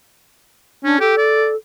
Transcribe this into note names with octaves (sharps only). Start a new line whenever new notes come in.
C#4 D4
G4 A4
D5